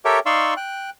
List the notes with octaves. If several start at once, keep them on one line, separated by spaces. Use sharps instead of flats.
G4 A4 A#4 C#5 E5 G5
D#4 D5 F5 C6 C#6 E6
G5 F#6